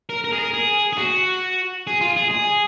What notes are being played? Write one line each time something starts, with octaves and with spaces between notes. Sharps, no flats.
A#4
A#4
G#4
A#4
G#4
G#4
F#4
G#4
F4
G#4
G#4